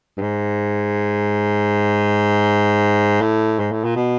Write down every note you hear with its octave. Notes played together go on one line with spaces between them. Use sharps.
G2
G#2
A2
G#2
A2
A#2
B2